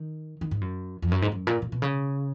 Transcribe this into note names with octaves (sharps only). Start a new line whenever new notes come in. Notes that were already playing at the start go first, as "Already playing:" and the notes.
Already playing: D#3
D#3
G#2
F#2
F2
F#2
G#2
F#2
A#2
A#2
B2
C#3